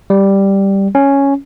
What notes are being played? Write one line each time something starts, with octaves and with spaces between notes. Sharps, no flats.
G3
C#4